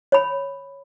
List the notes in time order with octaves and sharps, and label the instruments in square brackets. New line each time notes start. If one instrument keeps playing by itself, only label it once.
[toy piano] C#5 B5